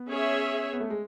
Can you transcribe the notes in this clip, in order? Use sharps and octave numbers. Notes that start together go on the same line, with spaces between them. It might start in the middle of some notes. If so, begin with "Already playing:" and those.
Already playing: B3
C#4 G#4 C#5 E5
B3
A3
G#3